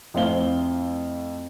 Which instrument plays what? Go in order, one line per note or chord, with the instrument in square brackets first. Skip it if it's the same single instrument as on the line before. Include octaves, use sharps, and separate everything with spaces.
[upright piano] F2 A2 C5 F5 G7